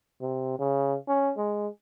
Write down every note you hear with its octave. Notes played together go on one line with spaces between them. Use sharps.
C3
C#3
C#4
G#3